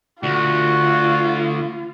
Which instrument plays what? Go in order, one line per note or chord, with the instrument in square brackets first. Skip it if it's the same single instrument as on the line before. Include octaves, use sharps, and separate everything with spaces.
[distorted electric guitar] D2 [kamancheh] F4 [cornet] F#4